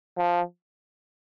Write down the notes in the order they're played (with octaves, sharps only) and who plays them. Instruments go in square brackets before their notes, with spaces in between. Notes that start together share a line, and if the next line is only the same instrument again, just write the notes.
[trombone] F3